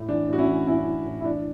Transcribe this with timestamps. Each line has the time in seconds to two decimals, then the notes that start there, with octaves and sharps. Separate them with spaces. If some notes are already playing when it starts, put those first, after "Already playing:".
Already playing: A2
0.09 E3 D4
0.28 A2 F#4
0.38 C#4 E4
0.48 E3
0.67 A2 C#4 E4
0.86 E3
1.06 A2
1.21 E4
1.25 E3 D4